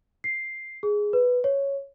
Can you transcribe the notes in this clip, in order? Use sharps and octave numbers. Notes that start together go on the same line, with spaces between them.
C7
G#4
B4
C#5